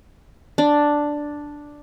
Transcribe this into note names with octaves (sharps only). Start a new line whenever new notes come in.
D4